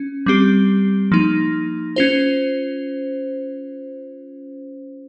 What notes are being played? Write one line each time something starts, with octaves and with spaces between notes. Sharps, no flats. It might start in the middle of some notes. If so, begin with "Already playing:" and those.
Already playing: C#4
G3 C4 G4
F3 A#3 D#4
C#4 F4 C5